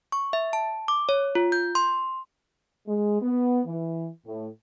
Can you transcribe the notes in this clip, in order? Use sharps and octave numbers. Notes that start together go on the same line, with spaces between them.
C#6
E5
A5
D6
C#5
F4
G6
C6
G#3
B3
E3
A2